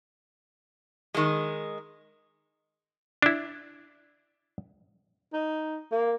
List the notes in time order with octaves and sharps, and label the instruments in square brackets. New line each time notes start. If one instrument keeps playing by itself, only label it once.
[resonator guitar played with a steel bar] D#3 G#3
[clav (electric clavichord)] D4 E4
[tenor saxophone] D#4
A#3